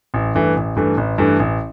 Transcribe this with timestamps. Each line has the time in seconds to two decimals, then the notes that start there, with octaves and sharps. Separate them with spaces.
0.14 A1
0.35 G2 E3 A3
0.56 A1
0.76 G2 E3 A3
0.97 A1
1.18 G2 E3 A3
1.40 A1